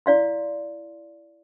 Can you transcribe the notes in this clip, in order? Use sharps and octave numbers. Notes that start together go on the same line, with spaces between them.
E4 D5 F5 C6